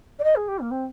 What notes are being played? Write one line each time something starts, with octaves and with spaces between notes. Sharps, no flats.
D5
D#5
G#4
G4
A#3
C4